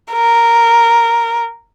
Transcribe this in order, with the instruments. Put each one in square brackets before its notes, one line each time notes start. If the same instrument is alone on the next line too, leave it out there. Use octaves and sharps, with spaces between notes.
[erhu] A#4